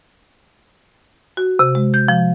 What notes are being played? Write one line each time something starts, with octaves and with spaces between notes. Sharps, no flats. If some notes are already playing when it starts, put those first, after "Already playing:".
F#4
C3
G#3
G6
F3